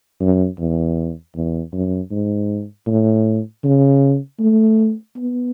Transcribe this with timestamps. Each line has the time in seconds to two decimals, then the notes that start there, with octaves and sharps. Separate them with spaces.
0.20 F#2
0.59 E2
1.35 E2
1.73 F#2
2.11 G#2
2.87 A2
3.64 C#3
4.40 A3
5.16 B3